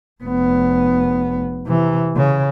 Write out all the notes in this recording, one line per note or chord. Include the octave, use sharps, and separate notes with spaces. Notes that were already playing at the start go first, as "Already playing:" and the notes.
F1 B3
C3 E3
C#3